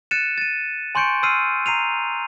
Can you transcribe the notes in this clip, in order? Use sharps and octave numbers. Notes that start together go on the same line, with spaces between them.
F#6 A6 C#7 D#7 E7
A6 D#7
G#5 C6 C#6 G6 C#7 D7
C6 E6 F6 C7 D#7
A#5 C7 D#7 F7